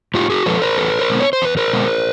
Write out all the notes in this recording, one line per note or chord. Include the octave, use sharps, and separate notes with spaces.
A2 F4 G4
F#4 G#4
F3 G#3 A4 B4
A#4 C5
E2 A4 B4
A#4 C5
B2 G#3 B3
C#5
C5
E2 B4
A#4 C5
B2 G#3 B3